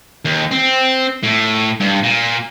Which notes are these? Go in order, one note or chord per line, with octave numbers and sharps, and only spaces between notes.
D#2
C4
A2
G2
A#2